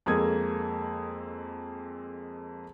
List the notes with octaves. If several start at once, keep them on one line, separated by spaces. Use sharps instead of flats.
F2 G#3 A#3 A4 D#6 G#6